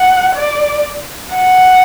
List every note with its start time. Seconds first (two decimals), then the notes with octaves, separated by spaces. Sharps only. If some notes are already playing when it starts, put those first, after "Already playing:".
Already playing: F#5
0.35 D5
1.35 F#5